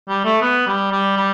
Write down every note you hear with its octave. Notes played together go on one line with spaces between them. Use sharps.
G3
A3
B3
G3
G3
G3